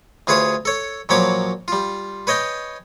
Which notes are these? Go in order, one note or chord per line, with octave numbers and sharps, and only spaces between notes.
D2 F4 G#4 B4 C#5 D#6
A4 C#5
A#2 F3 F#3 C#5 B5 D6
G3 F4
B4 C#5 D#5 G5 G#5